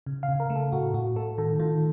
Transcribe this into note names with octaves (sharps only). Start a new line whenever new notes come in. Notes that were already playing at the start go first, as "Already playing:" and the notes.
C#3
F5
C#3
A#4
A3
A4
A2 F#4
A2 F#4
A3 A4
D#3 A4
D#3 F4